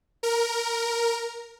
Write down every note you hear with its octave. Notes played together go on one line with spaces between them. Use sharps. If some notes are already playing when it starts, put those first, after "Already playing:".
A#4